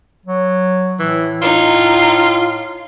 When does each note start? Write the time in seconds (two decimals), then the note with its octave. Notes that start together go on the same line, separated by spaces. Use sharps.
0.26 F#3
1.00 A2 E3
1.42 D#4 F4